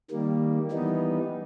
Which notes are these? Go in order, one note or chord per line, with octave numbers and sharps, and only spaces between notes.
D#3 G3 A#3
E3 G3 B3 D#4